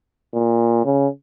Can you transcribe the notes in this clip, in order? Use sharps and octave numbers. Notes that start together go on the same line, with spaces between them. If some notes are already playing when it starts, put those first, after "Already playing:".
A#2
C#3